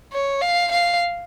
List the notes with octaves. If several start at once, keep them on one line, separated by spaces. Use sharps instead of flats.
C#5
F5
F5